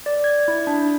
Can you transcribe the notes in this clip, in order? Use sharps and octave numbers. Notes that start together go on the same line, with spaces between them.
D5
G#6
E4
D4